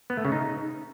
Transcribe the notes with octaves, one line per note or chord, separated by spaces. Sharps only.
B3
A3
C#3
D#4